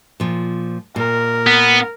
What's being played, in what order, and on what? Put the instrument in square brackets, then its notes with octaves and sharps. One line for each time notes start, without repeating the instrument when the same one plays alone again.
[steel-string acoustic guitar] A#2 F3
[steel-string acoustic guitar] A#2 [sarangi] A#4
[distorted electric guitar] B3